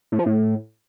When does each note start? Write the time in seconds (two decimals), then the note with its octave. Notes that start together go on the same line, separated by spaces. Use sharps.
0.12 A2
0.19 F3
0.26 A2